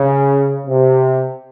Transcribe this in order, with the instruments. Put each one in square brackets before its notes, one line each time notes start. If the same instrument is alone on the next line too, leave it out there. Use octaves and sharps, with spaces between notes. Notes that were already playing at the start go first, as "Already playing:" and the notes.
Already playing: [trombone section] C#3
C3